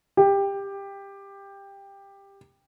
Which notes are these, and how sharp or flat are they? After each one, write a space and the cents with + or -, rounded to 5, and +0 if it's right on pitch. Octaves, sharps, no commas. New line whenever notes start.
G4 +15